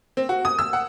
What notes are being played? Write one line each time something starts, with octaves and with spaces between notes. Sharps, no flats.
C4
F#4
D#6
E6
F#5